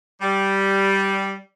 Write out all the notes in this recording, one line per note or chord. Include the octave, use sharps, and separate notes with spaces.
G3